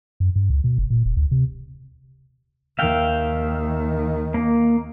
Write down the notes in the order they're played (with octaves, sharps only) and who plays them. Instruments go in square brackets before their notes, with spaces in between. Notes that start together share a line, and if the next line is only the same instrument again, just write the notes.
[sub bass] F#2
G2
C#2
B2
F#1
A#2
E1
D2
C3
[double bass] D#2 D#3 [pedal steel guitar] E5 F5 G5
[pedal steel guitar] A#3